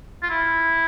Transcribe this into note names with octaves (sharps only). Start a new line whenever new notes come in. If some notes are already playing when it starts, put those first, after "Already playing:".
F4
E4